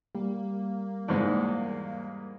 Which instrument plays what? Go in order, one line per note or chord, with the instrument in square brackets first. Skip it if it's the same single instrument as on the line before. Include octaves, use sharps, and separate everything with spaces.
[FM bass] G3 [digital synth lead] A#3
[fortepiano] E2 G#2 G#3